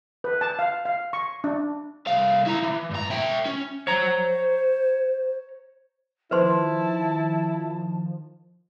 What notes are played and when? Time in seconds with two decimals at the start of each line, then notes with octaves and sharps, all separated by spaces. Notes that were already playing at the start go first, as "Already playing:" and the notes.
0.24 B4
0.41 A5
0.59 F5
0.85 F5
1.13 C#6
1.44 D4
2.07 C2 F5
2.46 E4 A#5
2.62 E3
2.91 G2 A#5
3.10 E4 G5
3.46 C#4
3.87 C5 C#5 A#5
6.31 D#3 F3 E4 B4 C5 A5 C6